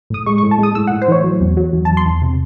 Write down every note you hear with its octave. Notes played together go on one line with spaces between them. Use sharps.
A2 D#6
G#3 C#6
C#6
A2
A5
G#3 D#6
A2 E6
F#5
A2
C5
E3 C#5
F#3
E2
F#3
E2
A5
E2
C6
E2
C3